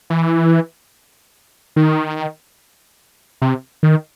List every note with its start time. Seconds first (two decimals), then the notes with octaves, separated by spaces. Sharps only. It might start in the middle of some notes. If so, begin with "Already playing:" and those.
0.10 E3
1.76 D#3
3.42 C3
3.83 D#3